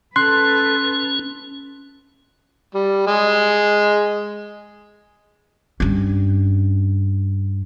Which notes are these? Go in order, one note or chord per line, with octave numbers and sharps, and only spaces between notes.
C#4 A4 B4 C6 F#6
G3
G#3
G2 C#4